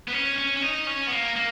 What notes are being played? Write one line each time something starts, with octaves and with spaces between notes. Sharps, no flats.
B3
C#4
C#4
C#4
D#4
C#4
B3
A#3
A#3